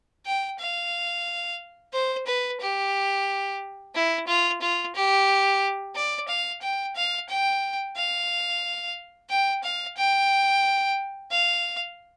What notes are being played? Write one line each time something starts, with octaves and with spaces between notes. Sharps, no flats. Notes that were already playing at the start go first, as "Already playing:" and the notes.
G5
F5
C5
B4
G4
E4
F4
F4
G4
D5
F5
G5
F5
G5
F5
G5
F5
G5
F5